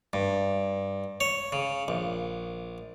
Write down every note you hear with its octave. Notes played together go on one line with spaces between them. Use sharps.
G2
C#5
C#3
A#1